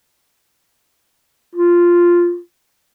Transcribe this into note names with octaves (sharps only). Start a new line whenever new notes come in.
F4